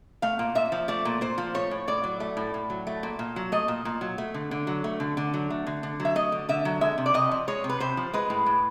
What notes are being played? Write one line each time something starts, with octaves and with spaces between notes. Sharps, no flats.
A3 F5
A#2
A#2 E5
F3
A3 D5
A#2
A#2 C5
F3
A3 C#5
A2
A2 D5
F#3
A3
A2
A2
F#3
A3
A#2
A#2
F#3
A3 D#5
A#2
A#2
F#3
A3
D3
D3
F#3
A3
D3
D3
F#3
A3
D3
D3
F#3
E5
A3 D#5
D3
D3 E5
F#3
G#3 E5
C3
D5
C3 D#5
F3
G#3 C#5
C3
B4
C3 C5
F3
G#3 B4
A2
A2